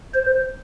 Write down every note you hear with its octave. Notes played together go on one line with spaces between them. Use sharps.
C5